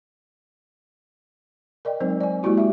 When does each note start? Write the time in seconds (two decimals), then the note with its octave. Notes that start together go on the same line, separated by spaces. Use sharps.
1.85 A#4 D5 D#5 G5
2.01 F#3 G#3 C4 D#4 C5
2.21 D5 G#5
2.43 G#3 A#3 E4 F#4 G4
2.58 G4 E5